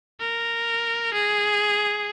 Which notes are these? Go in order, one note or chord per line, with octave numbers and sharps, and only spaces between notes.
A#4
G#4